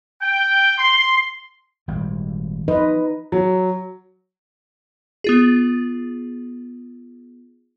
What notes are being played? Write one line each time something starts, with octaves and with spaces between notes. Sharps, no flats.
G5
C6
G#1 A#2 G3
F3 D#4 B4 D#5
F#3
B3 F4 G#4